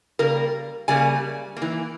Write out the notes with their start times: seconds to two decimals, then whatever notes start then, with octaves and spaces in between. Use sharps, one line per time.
0.19 C#3 G3 A#3 A#4
0.88 C#3 G3 A#3 G#5
1.57 A#3
1.62 E3